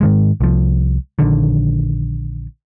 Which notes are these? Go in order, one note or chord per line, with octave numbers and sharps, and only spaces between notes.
G#2 D#3 G#3
C2 F3
A#1 D3 D#3